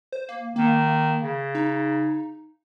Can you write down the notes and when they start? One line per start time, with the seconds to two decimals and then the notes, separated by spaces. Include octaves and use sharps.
0.12 C5
0.29 A#3
0.56 D#3 A#3
1.22 C#3
1.55 D#4